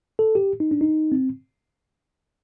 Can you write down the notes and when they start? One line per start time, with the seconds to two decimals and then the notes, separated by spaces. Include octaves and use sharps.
0.19 A4
0.35 G4
0.60 D#4
0.71 D4
0.81 D#4
1.12 C4